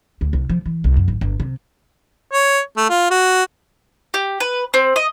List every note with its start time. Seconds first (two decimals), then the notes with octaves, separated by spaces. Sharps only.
0.21 D2
0.33 C2
0.49 F3
0.66 E3
0.84 C2
0.97 F#2
1.08 G#1
1.21 G1
1.40 C3
2.31 C#5
2.77 A3
2.89 F4
3.11 F#4
4.14 G4
4.40 B4
4.74 C4
4.96 D#5